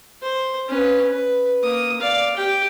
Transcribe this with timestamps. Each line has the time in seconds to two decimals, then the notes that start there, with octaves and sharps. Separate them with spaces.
0.22 C5
0.69 C#4 B4
1.10 B4
1.63 A#3 D#6
2.01 D5 F5
2.37 G4 G5